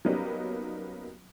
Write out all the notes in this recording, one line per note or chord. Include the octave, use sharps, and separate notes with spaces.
F#3 G3 A#3 B3 C#4 D#4